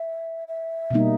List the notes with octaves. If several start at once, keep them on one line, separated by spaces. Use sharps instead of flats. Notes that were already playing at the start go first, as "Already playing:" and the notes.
Already playing: E5
E5
B2 G3 A#3 D#4